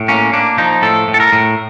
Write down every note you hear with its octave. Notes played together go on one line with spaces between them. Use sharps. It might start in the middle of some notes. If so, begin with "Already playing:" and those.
Already playing: A2
A#3 C#4
A#3 D4
F3 D#4
A2 A4
A2
A4
A#4
A2